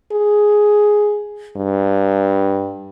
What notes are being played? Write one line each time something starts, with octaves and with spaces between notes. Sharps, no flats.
G#4
G2